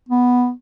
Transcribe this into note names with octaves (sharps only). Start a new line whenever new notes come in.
B3